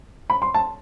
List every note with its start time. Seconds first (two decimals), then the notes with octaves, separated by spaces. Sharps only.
0.30 B5
0.42 C6
0.54 A5